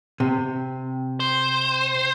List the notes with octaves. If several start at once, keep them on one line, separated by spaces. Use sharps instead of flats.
C3
C5